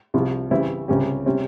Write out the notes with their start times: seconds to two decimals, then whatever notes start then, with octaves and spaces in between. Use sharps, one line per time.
0.14 C2 C3 F3
0.51 C#3 E3 G3 C4 E4
0.88 C#2 C3 G3 C#4 G4
1.26 C3 G3 C#4